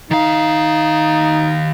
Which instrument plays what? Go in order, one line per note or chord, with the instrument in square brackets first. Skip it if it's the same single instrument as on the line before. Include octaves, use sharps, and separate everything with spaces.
[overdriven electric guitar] D#3 F5 [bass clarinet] D#4